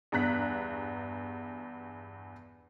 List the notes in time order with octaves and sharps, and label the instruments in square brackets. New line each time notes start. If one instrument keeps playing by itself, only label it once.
[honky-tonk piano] E2 G2 A#5 F#6 B6